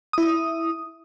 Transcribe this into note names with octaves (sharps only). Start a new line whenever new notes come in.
E4 D#6